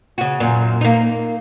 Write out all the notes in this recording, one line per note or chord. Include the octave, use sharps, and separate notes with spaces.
C#3 F#4
F#2 A#2
A#3 D#4